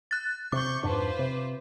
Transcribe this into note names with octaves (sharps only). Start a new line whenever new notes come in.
F#6 A6
C3 C#6 D6 G6
F2 G#2 D4 F4 B4 C5
C3